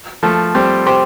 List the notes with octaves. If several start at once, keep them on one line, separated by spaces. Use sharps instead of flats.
F3 A3
G3 C4
G4 C5